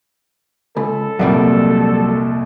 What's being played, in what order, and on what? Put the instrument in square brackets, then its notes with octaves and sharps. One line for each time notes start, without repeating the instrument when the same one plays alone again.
[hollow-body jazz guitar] C#2 [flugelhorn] A4 [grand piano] B5
[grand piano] C2 F2 A#2 [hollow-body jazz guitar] F#3 G3 A#3